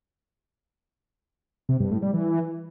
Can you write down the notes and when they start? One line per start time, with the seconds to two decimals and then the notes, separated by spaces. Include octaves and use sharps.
1.69 C3
1.80 G2
1.91 A2
2.02 G3
2.13 E3